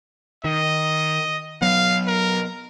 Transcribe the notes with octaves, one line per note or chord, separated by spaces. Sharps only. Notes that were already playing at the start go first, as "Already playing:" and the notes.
D#3 D#5
F#3 B3 F5
A#4